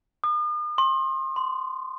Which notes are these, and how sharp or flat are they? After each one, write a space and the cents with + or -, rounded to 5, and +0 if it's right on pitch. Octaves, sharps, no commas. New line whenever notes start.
D#6 -45
C6 +30
C6 -25